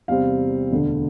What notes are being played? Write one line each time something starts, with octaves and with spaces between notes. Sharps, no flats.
E2 C3 G3 C4 F5
E1 D2 D3